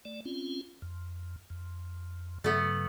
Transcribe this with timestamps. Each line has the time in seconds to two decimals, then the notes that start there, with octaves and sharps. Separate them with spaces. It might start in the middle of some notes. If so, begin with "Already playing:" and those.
0.05 A3 D5
0.25 C4 C#4 F4
0.82 F2
1.50 F2
2.44 G2 C#3 F#3 A3 B3